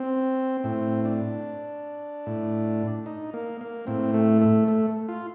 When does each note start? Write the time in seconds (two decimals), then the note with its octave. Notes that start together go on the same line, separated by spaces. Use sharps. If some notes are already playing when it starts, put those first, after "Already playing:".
Already playing: C4
0.64 A2 C4
1.05 D4
2.26 A2
3.06 D#4
3.34 A#3
3.61 A#3
3.87 A2 C4
4.14 A3
4.42 A3
4.68 A3
5.09 F4